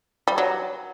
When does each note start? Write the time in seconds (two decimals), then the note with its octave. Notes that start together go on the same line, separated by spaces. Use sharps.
0.28 G3
0.38 F#3